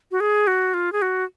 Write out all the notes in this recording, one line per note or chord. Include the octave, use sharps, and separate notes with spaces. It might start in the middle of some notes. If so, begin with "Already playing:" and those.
F#4
G#4
F#4
F4
G#4
F#4